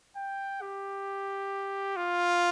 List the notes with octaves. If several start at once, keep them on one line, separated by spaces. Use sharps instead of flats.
G5
G4
F4